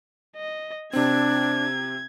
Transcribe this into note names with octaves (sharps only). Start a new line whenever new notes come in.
D#5
C3 C4 D4 G#6